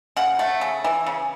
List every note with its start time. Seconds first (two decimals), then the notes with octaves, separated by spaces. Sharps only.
0.17 C#3 F#5
0.39 A3
0.61 C#3
0.84 E3
1.07 C#3